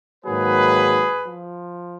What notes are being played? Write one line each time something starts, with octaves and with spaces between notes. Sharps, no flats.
G#2 D#3 F#3 A#3 G#4 B4
F3